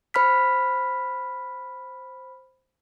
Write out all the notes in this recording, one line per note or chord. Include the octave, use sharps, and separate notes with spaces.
C5 B5 F6 B6